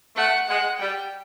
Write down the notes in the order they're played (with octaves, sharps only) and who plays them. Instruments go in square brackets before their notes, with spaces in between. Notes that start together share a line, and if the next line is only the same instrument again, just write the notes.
[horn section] A3 [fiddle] F#5
[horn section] G#3 [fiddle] F#5
[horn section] G3 [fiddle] G5